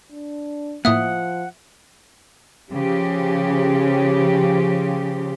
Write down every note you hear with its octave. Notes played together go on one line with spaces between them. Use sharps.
D4
A2 F3 A#3 E5 F#5 D#6
C#3 F3 G4